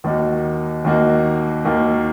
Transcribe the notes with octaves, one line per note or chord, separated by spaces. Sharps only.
D#2 D#3 A#3 D#4 F#4
D#2 D#3 A#3 D#4 F#4
D#2 D#3 A#3 D#4 F#4